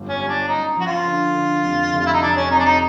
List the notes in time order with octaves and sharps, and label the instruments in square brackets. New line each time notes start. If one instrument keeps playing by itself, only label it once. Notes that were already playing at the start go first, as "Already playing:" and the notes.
Already playing: [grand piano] G1 F#3
[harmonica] C#4
[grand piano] G3
[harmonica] D4
[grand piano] C#4 [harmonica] D#4
[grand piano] F3 [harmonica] F#4
[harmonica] F4
[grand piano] D3
D3
F1
F1
[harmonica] F4
E4
D#4
[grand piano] F2 [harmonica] D4
[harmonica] C#4
[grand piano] F2 [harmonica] D#4
[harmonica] D4
D#4